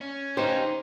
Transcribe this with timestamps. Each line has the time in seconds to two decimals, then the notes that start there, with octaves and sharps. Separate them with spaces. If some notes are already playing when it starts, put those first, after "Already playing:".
0.01 C#4
0.37 D#4 G4 C5